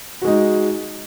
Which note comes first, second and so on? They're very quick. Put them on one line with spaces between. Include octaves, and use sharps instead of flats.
F#4 G#3 D#4